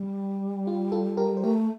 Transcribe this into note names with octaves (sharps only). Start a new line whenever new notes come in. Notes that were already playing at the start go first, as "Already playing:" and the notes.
Already playing: G3
F4
F4 A4
G4 A#4
C5
A3 G4 A#4